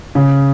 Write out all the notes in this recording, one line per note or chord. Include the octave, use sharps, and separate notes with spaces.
C#3